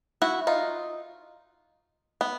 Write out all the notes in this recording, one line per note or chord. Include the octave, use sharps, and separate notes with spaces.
E4 F#4
D#4 F4
B3